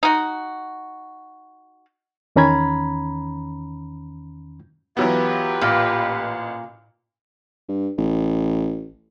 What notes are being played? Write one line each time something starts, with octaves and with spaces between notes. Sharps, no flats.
D#4 F#4
E2 D#3 C#4 A#5 B5 G#6
E3 F#3 B3 F4 G4 B4
A1 A#2
G2
A1